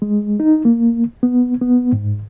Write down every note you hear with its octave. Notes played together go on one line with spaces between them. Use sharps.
G#3
D#4
A#3
B3
B3
G#2